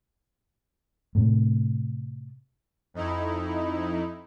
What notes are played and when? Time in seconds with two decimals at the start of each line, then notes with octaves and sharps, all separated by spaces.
1.15 A2 C3 A3
2.94 F2 D#4 E4